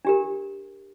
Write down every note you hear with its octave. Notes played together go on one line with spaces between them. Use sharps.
D4 G4 A#4